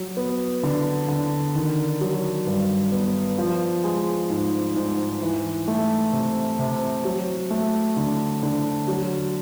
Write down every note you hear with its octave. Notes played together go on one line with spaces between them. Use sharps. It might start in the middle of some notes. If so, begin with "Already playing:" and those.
Already playing: F#3
B3
D3
D3
D#3
F#3
G2
B3
F3
G#3
G#2
G#2
E3
A3
C3
C3
F#3
A3
D3
D3
F#3